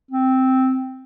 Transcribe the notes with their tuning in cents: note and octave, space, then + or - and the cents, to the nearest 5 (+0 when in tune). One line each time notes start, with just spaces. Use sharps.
C4 -5